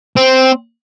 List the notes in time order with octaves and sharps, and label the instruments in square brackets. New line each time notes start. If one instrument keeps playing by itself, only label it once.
[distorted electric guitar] C4